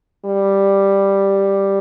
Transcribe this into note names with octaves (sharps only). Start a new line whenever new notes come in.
G3